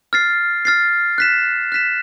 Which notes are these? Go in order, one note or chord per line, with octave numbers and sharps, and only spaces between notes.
F6 A6 C7
F6 A6 C7
F#6 B6 E7
F#6 B6 E7